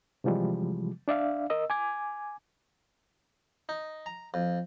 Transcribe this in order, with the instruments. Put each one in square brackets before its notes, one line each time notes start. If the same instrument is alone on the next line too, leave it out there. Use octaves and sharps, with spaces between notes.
[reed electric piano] C3 E3 F3 G3 G#3
D4 D5 E5 F5
A#4 D#5 E6
G#5 D6 G#6
[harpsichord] D#4
A#5
F2